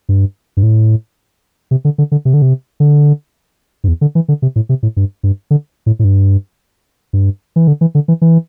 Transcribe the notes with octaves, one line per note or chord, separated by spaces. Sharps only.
G2
G2
A2
C3
D3
D3
D3
C3
D3
C3
D3
G2
E2
D3
E3
D3
C3
A2
C3
A2
G2
G2
D3
A2
A2
G2
G2
E3
D3
E3
D3
E3
E3